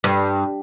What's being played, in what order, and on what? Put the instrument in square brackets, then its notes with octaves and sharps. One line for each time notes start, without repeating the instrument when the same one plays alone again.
[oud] G2